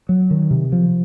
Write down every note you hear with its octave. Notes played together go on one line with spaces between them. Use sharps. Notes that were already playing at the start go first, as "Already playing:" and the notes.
F#3
D#3
C3
F3